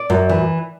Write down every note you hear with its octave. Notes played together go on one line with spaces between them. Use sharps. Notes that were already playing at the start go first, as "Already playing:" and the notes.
Already playing: D5
F#2
E3